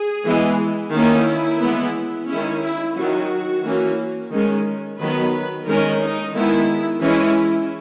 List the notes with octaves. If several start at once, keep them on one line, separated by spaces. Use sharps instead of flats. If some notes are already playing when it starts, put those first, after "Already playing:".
Already playing: G#4
E3 G#3 B3
D#3 A#3 C#4 E4
E3 G#3 B3
D#3 G#3 C#4 E4
E4
D#3 F#3 C#4 F#4
E3 A#3 C#4
D#3 G#3 C#4
D#3 F#3 B3 B4
D#3 G#3 C#4 A#4
D#4
D#3 G#3 B3 E4
E3 G#3 C#4 E4